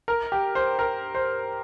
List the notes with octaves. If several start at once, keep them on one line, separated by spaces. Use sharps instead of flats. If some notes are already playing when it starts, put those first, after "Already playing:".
A#4
G4
C5
A#4
C5